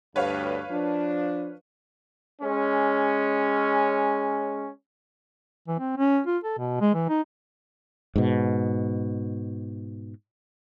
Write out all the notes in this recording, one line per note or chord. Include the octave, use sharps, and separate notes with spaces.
D2 G2 B4 C#5 F5
F3 D4
G#3 C#4
E3
C4
C#4
F4
A4
B2
G#3
E3
D#4
G#2 B2